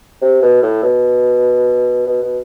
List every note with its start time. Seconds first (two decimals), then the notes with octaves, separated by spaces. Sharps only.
0.22 C3
0.42 B2
0.63 A2
0.83 B2
2.07 B2
2.22 B2